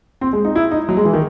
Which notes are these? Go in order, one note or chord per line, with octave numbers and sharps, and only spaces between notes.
C4
G#3
D#4
E4
D#4
F#3
G#3
E3
D#3